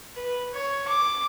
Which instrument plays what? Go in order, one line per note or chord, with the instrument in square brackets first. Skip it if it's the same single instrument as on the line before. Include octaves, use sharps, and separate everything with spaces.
[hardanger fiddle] B4
C#5
D6